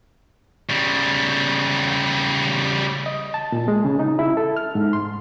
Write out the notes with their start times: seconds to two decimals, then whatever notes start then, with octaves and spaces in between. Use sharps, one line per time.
0.69 C#3 G3
3.06 D#5
3.34 A5
3.52 A#2
3.68 G#3
3.85 C#3
3.99 D#4
4.19 E4
4.37 A4
4.57 F6
4.75 G#2
4.93 C6